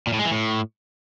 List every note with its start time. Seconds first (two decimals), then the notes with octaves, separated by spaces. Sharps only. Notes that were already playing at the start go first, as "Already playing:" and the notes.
0.07 A#2
0.13 A2
0.19 G#3
0.25 E3
0.31 A2